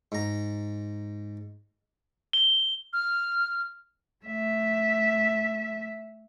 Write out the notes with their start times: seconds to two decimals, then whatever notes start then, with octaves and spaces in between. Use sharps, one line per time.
0.12 G#2 A#5
2.33 G7
2.93 F6
4.25 A3 E5